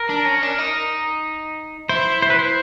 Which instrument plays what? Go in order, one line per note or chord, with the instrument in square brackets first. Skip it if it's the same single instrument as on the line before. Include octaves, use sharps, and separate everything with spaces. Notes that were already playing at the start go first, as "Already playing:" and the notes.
Already playing: [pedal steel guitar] A#4
[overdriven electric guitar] D4
C#4
D4
D#4
[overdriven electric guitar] E4 [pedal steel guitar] C5
[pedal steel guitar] C5
B4
C5